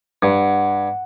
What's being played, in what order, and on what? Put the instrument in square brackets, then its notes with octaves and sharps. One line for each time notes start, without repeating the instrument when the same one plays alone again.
[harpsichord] G2 [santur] F#5